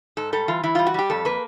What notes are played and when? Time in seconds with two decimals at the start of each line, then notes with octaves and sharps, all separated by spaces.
0.17 G#2 A4
0.32 G3 A4
0.48 E3 F4
0.63 E3 E4
0.75 G3 F4
0.87 F#4
0.94 G3 G4
1.10 F2 A4
1.25 A#3 B4